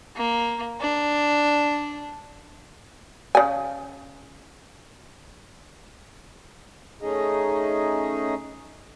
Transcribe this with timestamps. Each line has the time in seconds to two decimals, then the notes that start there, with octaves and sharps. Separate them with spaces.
0.16 A#3
0.80 D4
3.35 C#3 G#5
7.02 A3 C#4 D#4 G#4 D#5